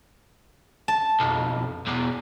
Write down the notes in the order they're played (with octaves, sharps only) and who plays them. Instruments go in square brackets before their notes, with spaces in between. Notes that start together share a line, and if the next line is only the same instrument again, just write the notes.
[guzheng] A5
[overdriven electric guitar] B1 F2
E2 B2